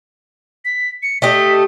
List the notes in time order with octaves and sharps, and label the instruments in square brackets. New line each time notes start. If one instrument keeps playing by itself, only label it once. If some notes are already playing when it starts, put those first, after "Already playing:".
[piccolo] B6
C#7
[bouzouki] A3 G4 D#5 [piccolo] B6